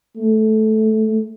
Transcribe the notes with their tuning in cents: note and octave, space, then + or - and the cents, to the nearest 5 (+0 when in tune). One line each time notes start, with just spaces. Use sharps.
A3 -15